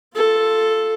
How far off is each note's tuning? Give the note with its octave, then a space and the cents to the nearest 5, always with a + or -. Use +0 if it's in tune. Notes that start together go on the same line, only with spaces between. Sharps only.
F4 +0 A4 +0